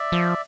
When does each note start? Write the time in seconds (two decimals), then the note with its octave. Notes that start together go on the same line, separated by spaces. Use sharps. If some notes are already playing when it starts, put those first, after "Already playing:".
Already playing: D5 E5
0.12 F3